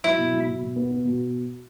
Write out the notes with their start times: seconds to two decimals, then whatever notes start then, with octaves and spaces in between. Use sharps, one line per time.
0.04 F#3 E4
0.18 B2
0.33 F#3
0.47 B2
0.62 B2
0.76 B3
0.91 B3
1.05 B2